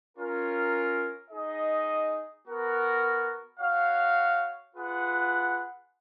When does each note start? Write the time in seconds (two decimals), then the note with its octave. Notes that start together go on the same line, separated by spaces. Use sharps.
0.16 C#4 F4 A#4
1.31 D#4 G#4 D#5
2.45 B3 F#4 A#4
3.58 F#4 C#5 F5
4.73 F4 G#4 B4 F#5